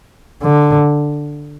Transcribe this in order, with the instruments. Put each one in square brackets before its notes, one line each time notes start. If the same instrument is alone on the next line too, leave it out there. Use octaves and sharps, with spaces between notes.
[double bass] D3